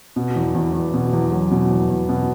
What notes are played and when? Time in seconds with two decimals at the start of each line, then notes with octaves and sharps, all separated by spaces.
0.16 B2
0.36 E2
0.54 E2
0.73 E2
0.94 B2
1.13 E2
1.32 F#3
1.51 B2
1.70 E2
1.89 E2
2.09 B2